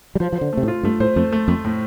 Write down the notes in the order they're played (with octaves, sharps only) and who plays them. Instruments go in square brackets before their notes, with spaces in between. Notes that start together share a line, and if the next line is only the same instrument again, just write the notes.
[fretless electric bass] G3
[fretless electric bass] F3 [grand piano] C5
[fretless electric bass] F3 [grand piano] C5
[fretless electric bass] D3
[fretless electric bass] C3 [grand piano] A3
[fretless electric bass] A2
[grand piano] F4
[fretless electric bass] G2 [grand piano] A3
[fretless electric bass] A2 [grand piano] C5
[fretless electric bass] F2 [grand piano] A3
[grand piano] A3
[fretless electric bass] F2 [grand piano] A3
[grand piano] A2